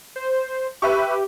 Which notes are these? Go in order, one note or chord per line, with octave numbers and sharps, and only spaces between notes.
C5
G4 B4 E5 C#6